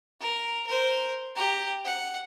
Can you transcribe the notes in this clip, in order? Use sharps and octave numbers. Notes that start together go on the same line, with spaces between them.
A#4
A#4 C5
G4 A#5
F#5